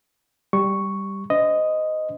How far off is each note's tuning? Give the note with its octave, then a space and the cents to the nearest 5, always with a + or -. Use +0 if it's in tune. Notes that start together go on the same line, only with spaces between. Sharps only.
G3 +0 C#6 +0
D4 -35 C5 -45 D#5 +0